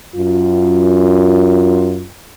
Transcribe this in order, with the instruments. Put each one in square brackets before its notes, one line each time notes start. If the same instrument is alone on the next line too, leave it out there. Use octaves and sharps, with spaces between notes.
[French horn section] F#2 F4